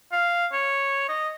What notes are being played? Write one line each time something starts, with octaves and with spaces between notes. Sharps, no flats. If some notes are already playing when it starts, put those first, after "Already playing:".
F5
C#5
D#5